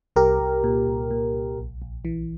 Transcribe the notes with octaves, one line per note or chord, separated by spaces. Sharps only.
C2 G4 A#4
C2
A#2
C2
A#2
C2
A#1
A#1
E3